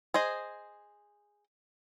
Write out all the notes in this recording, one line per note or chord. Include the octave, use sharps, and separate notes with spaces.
G#4 C5 D#5